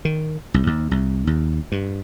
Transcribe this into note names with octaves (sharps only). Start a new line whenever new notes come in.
D#3
C2
D#2
C2
D#2
G2